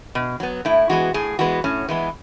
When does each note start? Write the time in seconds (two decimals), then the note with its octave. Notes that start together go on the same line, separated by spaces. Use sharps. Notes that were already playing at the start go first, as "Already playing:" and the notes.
0.15 B2
0.40 F#3 B3
0.65 A2 E4
0.89 E3 G#3 B3 F#4
1.14 A2 G#4
1.39 E3 G#3 B3 F#4
1.64 A2 C#4
1.89 E3 G#3 B3